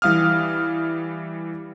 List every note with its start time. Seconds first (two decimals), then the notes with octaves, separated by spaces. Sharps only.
0.02 E3 G3 F5 D#6 F6